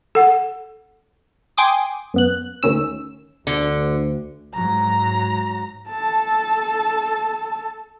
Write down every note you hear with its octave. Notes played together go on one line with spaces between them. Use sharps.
A4 F#5
G5 G#5 C6 D6 D#6
F#2 B3 F#6
D2 D#3 C#4 E6
D2 D3
G#2 F#3 A#5
A4 A5